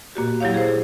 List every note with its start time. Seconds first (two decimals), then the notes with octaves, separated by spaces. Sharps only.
0.15 A#2 A#3 F#4 G4
0.40 F#3 E4 G4 C#5 F5
0.54 G#4 C5